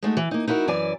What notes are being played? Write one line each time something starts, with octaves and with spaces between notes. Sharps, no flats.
G#3 A3 D#4 F#4
E3
A#3 D#4
D#4 E4 F#4 A4 A#4
F#2 E3 D5 G#5